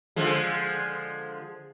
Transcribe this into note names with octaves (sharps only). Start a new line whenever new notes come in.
D3 F3 G#3